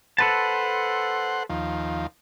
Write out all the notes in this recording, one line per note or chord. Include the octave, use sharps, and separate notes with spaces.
A4 B4 C5 F#5 A5
D#2 F3